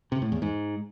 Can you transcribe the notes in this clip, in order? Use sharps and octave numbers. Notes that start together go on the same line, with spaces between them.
C3
A2
E2
G#2